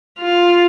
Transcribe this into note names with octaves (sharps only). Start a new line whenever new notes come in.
F4